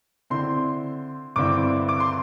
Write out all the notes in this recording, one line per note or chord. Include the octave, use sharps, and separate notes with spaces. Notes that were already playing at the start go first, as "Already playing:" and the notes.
D3 C4 E4 C6
G2 D3 C4 E4 D6
D6
C6